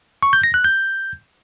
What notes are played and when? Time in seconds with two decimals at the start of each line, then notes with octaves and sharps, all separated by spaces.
0.23 C#6
0.33 G6
0.44 A#6
0.54 F#6
0.64 G6